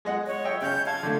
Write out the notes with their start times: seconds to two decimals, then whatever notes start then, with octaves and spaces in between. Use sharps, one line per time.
0.05 G#3 D#5 F#5
0.27 C#5
0.44 D#5 E5 G5
0.62 C#3 G6
0.86 F5 A5 G#6
1.03 D3 A3